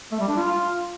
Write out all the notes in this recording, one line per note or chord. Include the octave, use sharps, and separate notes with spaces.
A3
G3
D4
F4